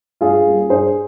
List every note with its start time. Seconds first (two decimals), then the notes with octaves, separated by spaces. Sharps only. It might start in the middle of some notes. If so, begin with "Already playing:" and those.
0.21 G2 F4 G#4
0.46 G3 A#3 C#4
0.70 G2 G#4 C5